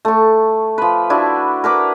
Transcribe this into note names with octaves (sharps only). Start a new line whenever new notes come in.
A3 C#6
F3 B4
D4 E4 F#4
A#4 B4 D6